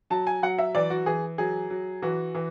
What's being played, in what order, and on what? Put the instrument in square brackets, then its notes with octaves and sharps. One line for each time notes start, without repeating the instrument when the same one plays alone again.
[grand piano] F#3 A5
G#5
F#3 F#5
E5
E3 D5
F#4
E3 G#4
F#3 G#4
F#3
E3 F#4
E3